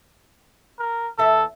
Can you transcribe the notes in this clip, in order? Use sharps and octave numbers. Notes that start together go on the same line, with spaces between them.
A#4
E2 A4 E5